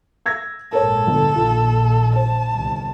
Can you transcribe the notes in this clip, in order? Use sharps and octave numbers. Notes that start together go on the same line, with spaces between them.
E6 G#6 A#6
A#1 G#2 A4 A#4 C#5
G1
A#1 D#3 F4
C5 A5
G1 C2 D#3